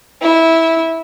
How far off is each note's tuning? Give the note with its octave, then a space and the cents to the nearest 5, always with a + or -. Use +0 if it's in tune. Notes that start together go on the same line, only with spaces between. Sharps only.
E4 -15